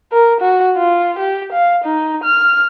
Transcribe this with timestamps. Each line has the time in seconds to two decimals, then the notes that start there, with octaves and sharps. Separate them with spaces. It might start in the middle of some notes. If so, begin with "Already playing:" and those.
0.12 A#4
0.41 F#4
0.76 F4
1.19 G4
1.52 F5
1.84 D#4
2.24 F6